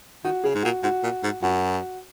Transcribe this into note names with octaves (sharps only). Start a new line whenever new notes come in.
D#3 F#4
C#3 G#4
G#2
A#2 F#4
G#2 F#4
A#2
G#2
F#2 F#4